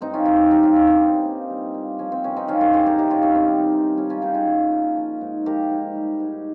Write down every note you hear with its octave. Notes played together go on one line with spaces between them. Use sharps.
G2 C4 D#4
C#4 F4
G3 D#4 G4
D#3 D#4 G4
C#4 F4
G2 C#4
C4
G3
A#2
G3
A#2
F3 C#4
C4
G2 C#4
C4 D#4
F3 C#4 F4
G4 A#4
G2 G#4 C5
G4 A#4
C3 D#4 G4
C#4 F4
G3 C#4
C4
D#3
C3
G3 C#4
C#4 F4
A#2 D#4 G4
F4 G#4
G3
A#2
F3
G#2
F3 G4 A#4
G#2
G3
G#2